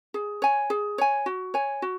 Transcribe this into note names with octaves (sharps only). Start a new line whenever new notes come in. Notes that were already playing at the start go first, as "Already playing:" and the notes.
G#4
C#5 G#5
G#4
C#5 G#5
F#4
C#5 G#5
F#4